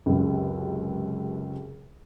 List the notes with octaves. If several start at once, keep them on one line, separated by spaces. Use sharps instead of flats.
C#2 F#2 C3